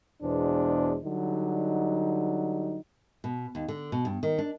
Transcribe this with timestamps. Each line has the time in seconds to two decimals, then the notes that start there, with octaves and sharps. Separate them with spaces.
0.22 E2 B2 G#3 D4 C5
1.04 D3 F#3 G3 D#4
3.24 B2
3.55 D#2
3.68 D3
3.92 B2
4.05 G2
4.23 D#3
4.38 D4